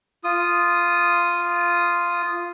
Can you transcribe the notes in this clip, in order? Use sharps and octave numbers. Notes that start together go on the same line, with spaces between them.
F4 D#6